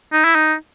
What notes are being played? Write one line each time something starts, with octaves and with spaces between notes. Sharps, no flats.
D#4
E4
D#4